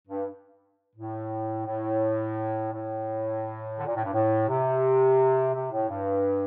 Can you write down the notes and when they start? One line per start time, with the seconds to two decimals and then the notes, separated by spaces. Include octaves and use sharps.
0.08 G2
0.96 A2
1.66 A2
2.73 A2
3.79 D3
3.87 A#2
3.96 A2
4.05 G2
4.14 A2
4.49 C3
5.54 C3
5.72 A2
5.90 G2